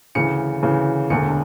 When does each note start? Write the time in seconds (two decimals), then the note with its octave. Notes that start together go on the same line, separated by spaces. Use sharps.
0.15 D2 C#3 E3 C#7
0.62 D2 C#3 E3
1.10 E1 D2 D3 C#7